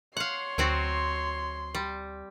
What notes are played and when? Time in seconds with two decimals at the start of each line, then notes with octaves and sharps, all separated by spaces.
0.17 C#5 F5 F#5 C6
0.58 D2 F#3 C4 F#4
1.75 G3